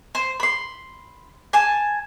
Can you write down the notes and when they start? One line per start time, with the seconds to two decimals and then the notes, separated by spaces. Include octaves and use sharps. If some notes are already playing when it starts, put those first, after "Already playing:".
0.15 C5
0.40 B5 C6
1.53 G#5 A5